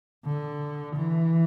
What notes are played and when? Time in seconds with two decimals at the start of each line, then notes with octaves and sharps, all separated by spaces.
0.25 D3
0.96 E3